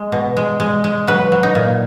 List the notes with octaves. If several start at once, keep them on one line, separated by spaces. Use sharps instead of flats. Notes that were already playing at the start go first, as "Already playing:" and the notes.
Already playing: G#3
B2
G#3
G#3
G#3
F#3 B4
F#3
D#4
A#2